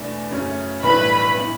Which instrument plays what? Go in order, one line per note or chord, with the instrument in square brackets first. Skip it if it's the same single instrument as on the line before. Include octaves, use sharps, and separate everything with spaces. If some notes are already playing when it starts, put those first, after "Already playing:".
Already playing: [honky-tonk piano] E2 B2 A3 D4
F#2 C#3 F#3 A3 C#4
[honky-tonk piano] B1 A2 E3 G3 D4 [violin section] B4 B5
[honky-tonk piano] E3 B3